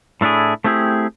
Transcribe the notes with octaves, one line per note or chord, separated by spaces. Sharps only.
A2 A3 D4 E4 G#4
A3 C4 E4 G4 G#4